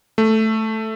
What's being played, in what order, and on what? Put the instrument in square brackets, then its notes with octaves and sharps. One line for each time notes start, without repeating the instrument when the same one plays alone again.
[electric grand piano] A3